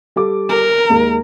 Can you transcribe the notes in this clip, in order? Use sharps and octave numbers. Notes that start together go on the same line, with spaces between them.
G3 A4 D6
A#4
D#2 G#3 A#3